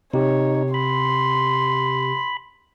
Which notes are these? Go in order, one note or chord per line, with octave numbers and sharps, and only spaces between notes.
C3 D#4 G4 C#5
B5 C6